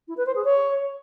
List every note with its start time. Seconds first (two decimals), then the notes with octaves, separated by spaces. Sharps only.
0.08 E4
0.17 B4
0.26 C5
0.35 G#4
0.44 C#5